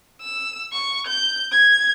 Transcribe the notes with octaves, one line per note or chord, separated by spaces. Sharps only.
E6
C#6
G6
G#6